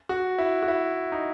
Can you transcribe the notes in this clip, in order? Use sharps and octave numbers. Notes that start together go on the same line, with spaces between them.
F#4
E4
F#4
E4
D#4